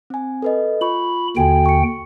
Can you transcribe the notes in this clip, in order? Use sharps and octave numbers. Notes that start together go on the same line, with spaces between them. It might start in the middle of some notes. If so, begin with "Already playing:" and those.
C4 G#5
A4 B4 D#5
F4 B5 C#6
D#2 D3 F#4 A4 G5 G#5
C#6 C#7